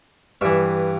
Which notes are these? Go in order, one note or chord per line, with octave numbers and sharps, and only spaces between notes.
G2 E3 E5